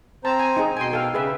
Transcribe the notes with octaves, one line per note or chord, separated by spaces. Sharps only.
C4 C5 A5 A#5
G#5
D#4 G#4
B2 G5 G#5 C6
A4 F5
C#3 G#4 B4 E5